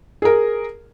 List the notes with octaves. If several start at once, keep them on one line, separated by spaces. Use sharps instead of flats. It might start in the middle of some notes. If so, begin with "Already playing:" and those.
G#4 A#4